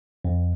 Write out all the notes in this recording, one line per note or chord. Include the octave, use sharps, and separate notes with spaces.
F2